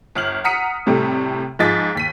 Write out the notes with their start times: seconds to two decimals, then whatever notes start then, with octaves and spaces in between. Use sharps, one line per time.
0.15 G1 F6 F#7
0.44 F#5 A#5 D#6 B6 C#7 D#7
0.86 A2 C3 G3 A3
1.59 G#2 F3 G#4 D#5 A6 B6
1.95 D#2 B6 D#7